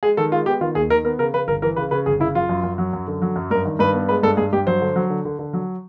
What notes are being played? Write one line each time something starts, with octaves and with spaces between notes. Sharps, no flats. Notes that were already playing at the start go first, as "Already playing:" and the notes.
G#3 G#4
D#3 A4
G#3 F4
B3 G4
D#3 F4
D#2 G#4
D#3 A#4
B3 A#4
C#3 A#4
C#3 B4
G1 A#4
E3 A#4
C#3 B4
C#3 B4
G1 G#4
C#3 E4
F#2 F4
F#2
F#2
F#3
F#2
D3
F#3
F#2
G2 A#4
D#3
G2 B4
B3
G#3 B4
G2 A4
G2 G#4
G2 G4
F#3 C5
D3
F#3
D3
D3
D3
F#3